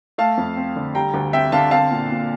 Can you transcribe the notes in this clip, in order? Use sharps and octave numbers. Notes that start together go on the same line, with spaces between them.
A3 F5 A5
F2
C4
D3
G3 G5 A#5
D2
C4 E5 G5
D3 F5 A5
C4 F5 A5
A#2
A#2